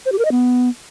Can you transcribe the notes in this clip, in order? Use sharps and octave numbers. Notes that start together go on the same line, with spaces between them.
C5
G4
A#4
D#5
B3